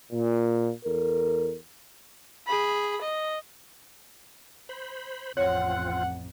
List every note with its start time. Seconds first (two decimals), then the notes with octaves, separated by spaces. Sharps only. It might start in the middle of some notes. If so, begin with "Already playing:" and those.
0.12 A#2
0.85 E2 A4 A#4
2.47 G#4 B5
3.02 D#5
4.69 C5 B5
5.37 A1 F2 C4 F4 C#5 F#5